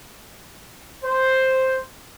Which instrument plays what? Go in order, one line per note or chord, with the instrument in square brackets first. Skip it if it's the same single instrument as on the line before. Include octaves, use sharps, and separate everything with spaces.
[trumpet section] C5